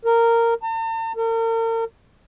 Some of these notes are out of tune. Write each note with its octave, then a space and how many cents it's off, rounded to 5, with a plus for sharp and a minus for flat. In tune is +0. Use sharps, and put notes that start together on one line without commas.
A#4 -10
A5 +45
A#4 -40